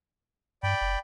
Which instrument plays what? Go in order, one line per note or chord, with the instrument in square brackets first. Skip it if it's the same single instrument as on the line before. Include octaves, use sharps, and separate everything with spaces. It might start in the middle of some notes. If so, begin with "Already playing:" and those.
[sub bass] G2 [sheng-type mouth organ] D5 G5 B5
[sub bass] F#1